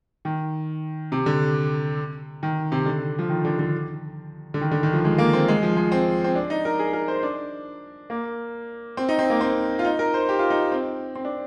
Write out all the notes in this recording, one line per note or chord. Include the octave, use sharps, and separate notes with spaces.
D#3
C3
D3
D#3
C3
D3
F3
D#3
D3
D3
D3
D#3
D3
D#3
F3
G#3
A#3
C4
G#3
F3
G#3
C4
C4
D4
D#4
A#4
G#4
A#4
C5
D4
A#3
C4
D#4
C4
A#3
C4
F4
D#4
A#4
C5
G4
F4
D#4
C4
C4
D4